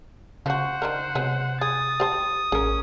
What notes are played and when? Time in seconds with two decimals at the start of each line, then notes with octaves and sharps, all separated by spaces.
0.46 C#3 F3 F#4 C5 F#5
0.82 D#3 D4 A#4
1.15 C3 F#3 G#3 B3
1.61 G#4 D#6 A6
2.00 G4 C5 A5
2.52 A1 C#4 G#4 A#4